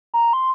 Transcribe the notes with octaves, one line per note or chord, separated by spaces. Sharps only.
A#5
C6